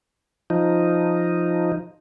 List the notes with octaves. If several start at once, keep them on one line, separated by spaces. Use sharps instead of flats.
F3 D#4